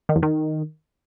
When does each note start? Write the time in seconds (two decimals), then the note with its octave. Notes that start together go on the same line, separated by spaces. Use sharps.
0.09 D#3
0.16 E2
0.23 D#3